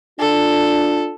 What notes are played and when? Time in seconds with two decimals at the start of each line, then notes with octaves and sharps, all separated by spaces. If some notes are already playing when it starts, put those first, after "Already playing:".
0.19 D4 F4 A4